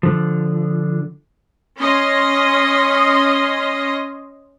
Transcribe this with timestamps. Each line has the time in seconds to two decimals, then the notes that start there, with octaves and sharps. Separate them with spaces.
0.03 D3 F3
1.78 C#4 D#5 C6